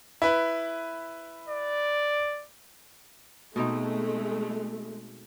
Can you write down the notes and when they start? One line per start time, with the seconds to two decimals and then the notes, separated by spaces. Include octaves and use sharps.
0.22 E4 B4
1.48 D5
3.56 B2 G#3 A3 C4 D#4